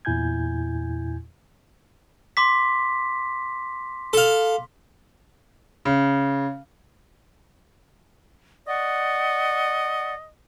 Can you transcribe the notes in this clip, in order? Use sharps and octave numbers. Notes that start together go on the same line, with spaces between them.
E2 A#2 E4 G#5 G6 G#6
C6 D6 B6
A4 F5
C#3
D5 D#5 F#5 C#6